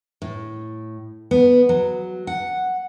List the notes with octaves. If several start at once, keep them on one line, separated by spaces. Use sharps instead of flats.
A2
B3
F#3
F#5